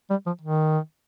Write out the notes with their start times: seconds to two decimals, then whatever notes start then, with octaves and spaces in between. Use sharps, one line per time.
0.10 G3
0.26 F3
0.41 D#3